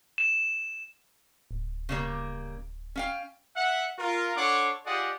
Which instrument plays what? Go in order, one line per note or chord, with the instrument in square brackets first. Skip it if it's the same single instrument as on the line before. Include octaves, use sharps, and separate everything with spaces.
[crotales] E7
[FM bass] D1
[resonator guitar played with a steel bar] C#3 G3 A#3
C#4 F5 G5
[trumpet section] E5 F#5
F4 A#4
D4 A4 C#5 F#5 C6 D6
F4 G4 G#4 D5 D#5 F#5